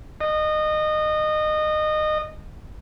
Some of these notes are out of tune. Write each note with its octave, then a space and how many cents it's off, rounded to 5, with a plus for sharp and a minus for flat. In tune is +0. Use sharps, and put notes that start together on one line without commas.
D#5 -20